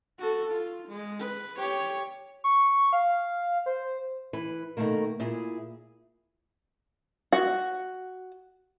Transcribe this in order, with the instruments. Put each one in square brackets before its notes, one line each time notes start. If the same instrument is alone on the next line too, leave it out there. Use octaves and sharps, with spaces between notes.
[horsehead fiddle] F#4 A4
F4
G#3
B4
G4 C#5
[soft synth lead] C#6
F5
C5
[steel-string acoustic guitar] E3 B4
B2 D#3 A3 A#3 A#4
A#2 E4 G#4
[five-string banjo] F#4